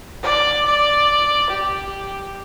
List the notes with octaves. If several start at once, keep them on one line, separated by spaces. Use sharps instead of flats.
D5
D5
G4